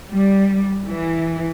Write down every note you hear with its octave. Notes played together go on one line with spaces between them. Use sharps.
G3
E3